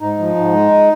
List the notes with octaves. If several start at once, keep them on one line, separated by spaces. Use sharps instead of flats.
G#2 D#4
F3
G#2
G#3